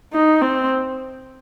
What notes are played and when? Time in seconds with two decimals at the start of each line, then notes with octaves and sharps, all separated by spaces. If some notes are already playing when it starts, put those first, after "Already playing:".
0.13 D#4
0.42 C4